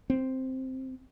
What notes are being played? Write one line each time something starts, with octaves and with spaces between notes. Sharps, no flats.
C4